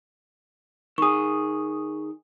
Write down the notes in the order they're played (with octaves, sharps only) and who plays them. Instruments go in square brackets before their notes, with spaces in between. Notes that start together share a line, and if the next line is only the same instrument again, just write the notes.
[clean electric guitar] D#3 G#4 [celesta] C#6 D#6